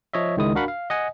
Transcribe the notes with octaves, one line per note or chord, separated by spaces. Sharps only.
F3 C#5 D#5 E5
C#2 D#3 G#3 E4 D#6
D4 F#4 A#4 F5 F#5 B5
F5
D#5 F#5 G#5